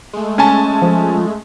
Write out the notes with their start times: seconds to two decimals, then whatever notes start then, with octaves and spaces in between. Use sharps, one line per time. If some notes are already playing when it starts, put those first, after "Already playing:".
0.13 G#3 A3
0.38 C#4 G#5 A5
0.82 F3